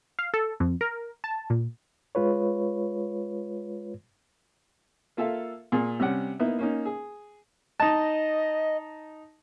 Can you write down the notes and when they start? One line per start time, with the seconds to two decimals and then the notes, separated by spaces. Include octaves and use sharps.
0.19 F5
0.34 A4
0.60 F2
0.81 A#4
1.24 A5
1.50 A#2
2.15 G#3 F4 B4 C#5
5.17 A#3 F4 A4 E5 F5
5.72 A#2 G#4
6.00 C3 G3 C#4 F#5
6.39 A#3 B3 D#4 E4
6.59 A#3 C#4 D#4
6.85 G#4
7.80 D#4 D#5 A5